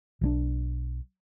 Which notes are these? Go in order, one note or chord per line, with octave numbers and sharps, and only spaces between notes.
B1 E3 D4